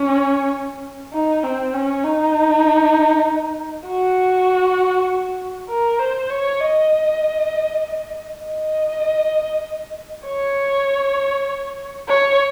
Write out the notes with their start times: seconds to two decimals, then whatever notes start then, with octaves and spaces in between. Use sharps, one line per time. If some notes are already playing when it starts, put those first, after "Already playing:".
Already playing: C#4
1.13 D#4
1.43 C4
1.74 C#4
2.04 D#4
3.87 F#4
5.69 A#4
5.99 C5
6.30 C#5
6.60 D#5
8.43 D#5
10.26 C#5
12.08 C#5